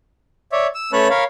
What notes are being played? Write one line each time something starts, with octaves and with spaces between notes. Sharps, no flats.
C#5 D5 E5
E6
A3 C#4 B4 C#5 A5 F#6
A#4 C#5 F5 B5